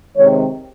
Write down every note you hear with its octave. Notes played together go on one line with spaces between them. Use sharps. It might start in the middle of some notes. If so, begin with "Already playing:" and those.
C3 D#3 G#3 C#5